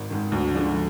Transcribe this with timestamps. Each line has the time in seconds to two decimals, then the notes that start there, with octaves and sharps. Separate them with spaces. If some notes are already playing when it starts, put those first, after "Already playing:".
Already playing: G#1
0.10 G#2 D#3
0.32 D2
0.55 D3 F3 G#3 D4